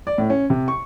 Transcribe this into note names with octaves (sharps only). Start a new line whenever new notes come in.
D5
A2
C#4
C3
C#6